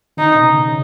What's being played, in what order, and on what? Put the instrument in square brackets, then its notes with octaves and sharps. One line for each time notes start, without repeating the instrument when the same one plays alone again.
[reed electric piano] D#3 [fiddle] D#4
[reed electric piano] B2
C#3
C#3